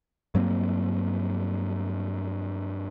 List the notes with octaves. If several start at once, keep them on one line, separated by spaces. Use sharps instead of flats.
G2 F#3 A#3 C4